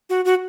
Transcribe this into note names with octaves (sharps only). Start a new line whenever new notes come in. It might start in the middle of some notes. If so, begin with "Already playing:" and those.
F#4
F#4